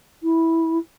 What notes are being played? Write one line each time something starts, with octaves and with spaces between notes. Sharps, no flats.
E4